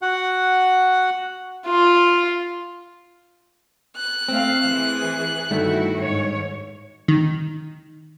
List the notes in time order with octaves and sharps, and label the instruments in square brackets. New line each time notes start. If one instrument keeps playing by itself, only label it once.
[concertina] F#4 F#5
[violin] F4
[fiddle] F#6
[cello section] A3 F5 [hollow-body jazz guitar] C4
[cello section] E3 G#4
[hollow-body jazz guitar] G2 D#3 A3 [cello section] E4 F#4
[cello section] G#2 C#5
[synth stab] D#3